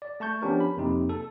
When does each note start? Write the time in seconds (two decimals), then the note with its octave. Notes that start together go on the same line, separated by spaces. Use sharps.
0.02 D5
0.20 A3 A5 C#6 G6
0.42 F3 B3 C#4 D4 G4 A#4
0.60 B5
0.77 F2 C3 A#3 D#4
1.09 A4